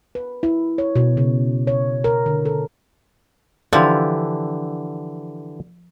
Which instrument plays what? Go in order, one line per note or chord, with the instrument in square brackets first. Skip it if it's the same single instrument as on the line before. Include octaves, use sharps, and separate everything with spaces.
[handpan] B4
E4
C#5
B2
C#3
C#5
A#4
D3
A4
[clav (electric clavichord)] D3 E3 G4 [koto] F3